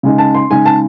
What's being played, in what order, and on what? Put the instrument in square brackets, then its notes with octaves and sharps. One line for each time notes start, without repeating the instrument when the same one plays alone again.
[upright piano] C#3 G#3 D#4
A5
C6
C#3 G#3 D#4 G#5
A5